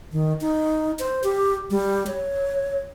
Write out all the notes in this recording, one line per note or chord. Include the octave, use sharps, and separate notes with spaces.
D#3
D#4
C5
G4
G3
C#5